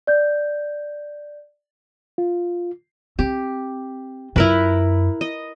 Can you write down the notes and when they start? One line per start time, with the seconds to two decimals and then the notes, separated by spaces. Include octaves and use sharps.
0.07 D5 G6
2.18 F4
3.19 C4 G4
4.36 F#2 E4 F4 A#4 B4
5.21 D#5